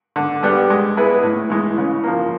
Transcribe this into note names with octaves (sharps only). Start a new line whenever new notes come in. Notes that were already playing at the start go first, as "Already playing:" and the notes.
D3
G3 B3 D4 G4
G#3
B3 E4 G#4 B4
A2
E3 G#3
C#3
F3 A#3